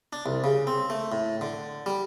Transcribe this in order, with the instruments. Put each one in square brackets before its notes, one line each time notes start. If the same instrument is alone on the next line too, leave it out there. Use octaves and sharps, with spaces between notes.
[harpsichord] D4
C2
C#3
C4
A3
A2
D3
G3